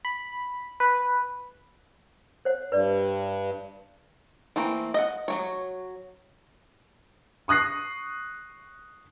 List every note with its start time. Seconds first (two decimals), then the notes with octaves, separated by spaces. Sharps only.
0.05 B5
0.80 B4
2.45 C5 C#5 F#5
2.72 G2 B4 D5
4.56 E3 A3 A#3 C4
4.94 D#5 E5 F#5
5.28 F#3 A#3 C#5
7.48 C#6 D#6 F#6 A#6 C7